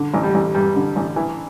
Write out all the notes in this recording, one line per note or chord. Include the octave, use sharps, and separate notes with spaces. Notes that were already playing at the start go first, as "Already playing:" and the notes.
Already playing: D3
A1
G3
A1
G2 G3
D3
A1
E3